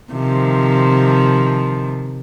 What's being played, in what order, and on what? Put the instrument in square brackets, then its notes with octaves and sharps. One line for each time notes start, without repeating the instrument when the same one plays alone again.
[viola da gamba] C3 D#3 F3